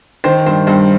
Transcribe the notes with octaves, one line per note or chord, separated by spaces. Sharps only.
D#3 C5
G2 C5
G2 C5